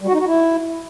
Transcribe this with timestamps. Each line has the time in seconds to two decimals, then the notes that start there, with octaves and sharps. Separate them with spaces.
0.01 G3
0.07 F#4
0.13 D#4
0.20 F#4
0.26 E4